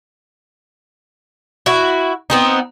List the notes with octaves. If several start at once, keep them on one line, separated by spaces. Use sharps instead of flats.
E4 F#4
B3 C4 D#4